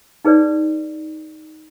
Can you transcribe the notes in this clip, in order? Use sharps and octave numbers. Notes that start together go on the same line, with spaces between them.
D#4 G#4 B4 C#5 D5